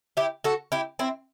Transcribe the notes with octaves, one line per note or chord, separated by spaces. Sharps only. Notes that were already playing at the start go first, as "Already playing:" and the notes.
E4 G4
F#4 A4
E4 G4
C4 E4